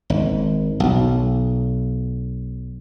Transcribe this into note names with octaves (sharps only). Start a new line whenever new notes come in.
G#1
B1